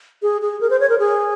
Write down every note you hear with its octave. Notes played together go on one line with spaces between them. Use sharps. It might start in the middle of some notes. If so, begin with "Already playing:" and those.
G#4
G#4
A#4
C5
C#5
A#4
G#4